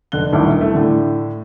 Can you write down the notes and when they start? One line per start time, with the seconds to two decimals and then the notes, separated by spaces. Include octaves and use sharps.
0.12 F1 D3 F#6 G7
0.32 D#1 A1 D2 D#3 E4 D6
0.61 C2 A3
0.75 A2 D3